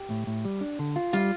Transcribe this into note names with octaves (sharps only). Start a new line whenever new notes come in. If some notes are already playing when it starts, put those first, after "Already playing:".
Already playing: G4
A2
A2
G3
D4
D3
F4
G3 F4